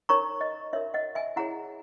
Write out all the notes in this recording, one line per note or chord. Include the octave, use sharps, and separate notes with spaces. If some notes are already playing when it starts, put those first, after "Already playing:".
D#4 A#4 C#5 A#5 C#6
D#5
D#4 F#4 A#4 C#5 E5
D#5 F#5
E5 G#5
E4 G#4 C#5 F#5 A#5